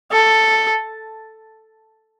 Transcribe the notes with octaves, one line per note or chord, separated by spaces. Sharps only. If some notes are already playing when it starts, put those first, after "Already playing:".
A4